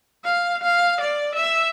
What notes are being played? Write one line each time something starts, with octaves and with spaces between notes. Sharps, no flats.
F5
F5
D5
E5